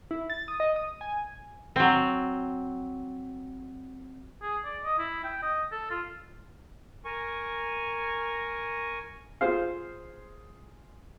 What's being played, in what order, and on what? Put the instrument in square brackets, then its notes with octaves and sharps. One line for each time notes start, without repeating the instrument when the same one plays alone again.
[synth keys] E4
A6
D#6
D#5
D#6
G#5
[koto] F#3 C4
[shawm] G#4
D5
D#5
E4
G5
D#5
A4
F4
[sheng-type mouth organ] A#4 G#5 C#6
[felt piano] F4 G#4 [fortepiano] C5 F5